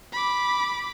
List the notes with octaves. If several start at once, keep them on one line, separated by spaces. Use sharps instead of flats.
B5 D6